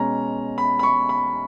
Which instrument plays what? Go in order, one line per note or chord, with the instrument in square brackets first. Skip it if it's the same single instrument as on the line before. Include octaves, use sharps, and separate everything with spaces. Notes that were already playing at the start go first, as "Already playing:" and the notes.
Already playing: [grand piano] B2 G#3 C#4 A#5
B5
B5
C#6
B5